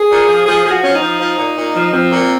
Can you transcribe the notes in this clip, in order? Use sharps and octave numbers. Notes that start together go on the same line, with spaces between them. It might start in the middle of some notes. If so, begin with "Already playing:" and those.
Already playing: G#4
A#2
F3
F3 G#4
F3 G#4
F#4
F3 C#4
D#4
F3
F3
A#2
A#2
F3
F3 C4
A#2